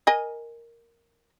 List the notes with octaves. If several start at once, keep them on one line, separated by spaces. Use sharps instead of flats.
A#4 D#5 G#5